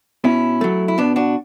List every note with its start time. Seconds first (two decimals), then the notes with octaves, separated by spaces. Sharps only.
0.24 B2 C#4 E4
0.61 F#3 A3
0.88 E4
0.98 B2 B3 D4
1.16 D4 F#4